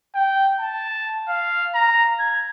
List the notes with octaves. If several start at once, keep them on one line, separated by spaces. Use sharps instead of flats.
G5
A5
F5
A#5
G#6